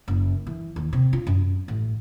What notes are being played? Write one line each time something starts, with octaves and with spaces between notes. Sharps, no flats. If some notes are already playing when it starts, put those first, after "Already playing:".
F#1
E3
D#2
C3
F4
F#2
A1